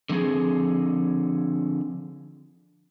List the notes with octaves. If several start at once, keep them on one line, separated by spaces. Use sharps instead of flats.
D3 F3 C4 G#4